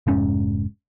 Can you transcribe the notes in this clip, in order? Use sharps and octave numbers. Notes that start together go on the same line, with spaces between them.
F1 G#2 C#4